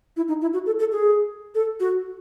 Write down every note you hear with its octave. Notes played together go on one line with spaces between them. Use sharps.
E4
D#4
E4
F#4
A4
A4
G#4
A4
F#4